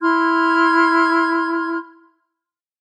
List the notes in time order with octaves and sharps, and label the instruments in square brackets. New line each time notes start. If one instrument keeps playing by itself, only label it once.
[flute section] E4 C6 F6 G#6